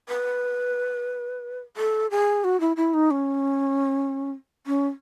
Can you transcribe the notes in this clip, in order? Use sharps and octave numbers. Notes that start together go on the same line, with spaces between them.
B4
A4
G#4
F#4
E4
E4
D#4
C#4
C#4